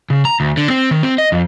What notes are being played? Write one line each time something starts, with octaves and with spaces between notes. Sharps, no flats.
C#3
A#5
D2
D3
C4
D#3
C4
D#5
F2